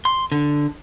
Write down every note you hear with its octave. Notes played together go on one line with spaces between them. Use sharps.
C6
D3